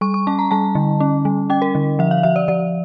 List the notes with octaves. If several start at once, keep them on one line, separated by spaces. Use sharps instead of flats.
G3 C#6
C#6
C#4 A5
A#5
G3 A5
D3
C#4
G3
C#4 G5
A#4
D3
F3 E5
F5
F3 E5
D5
F3 D5